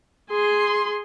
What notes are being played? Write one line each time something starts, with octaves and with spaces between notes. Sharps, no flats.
G#4 C6